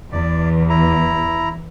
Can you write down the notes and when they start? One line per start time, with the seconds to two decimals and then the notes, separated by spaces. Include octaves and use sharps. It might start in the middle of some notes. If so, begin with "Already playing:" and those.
0.12 E2 D5
0.70 E4 A#5